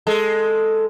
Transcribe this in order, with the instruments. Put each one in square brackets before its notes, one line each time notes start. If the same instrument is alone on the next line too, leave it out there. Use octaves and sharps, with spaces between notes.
[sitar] G#3 A4